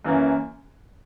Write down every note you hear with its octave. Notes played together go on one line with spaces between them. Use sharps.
F#2 E3 A#3 C#4